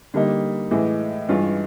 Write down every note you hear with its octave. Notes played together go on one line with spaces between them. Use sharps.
D3 G3 A#3 D#4
A2 E3 G#3
G2 E3 G#3 C#4 F4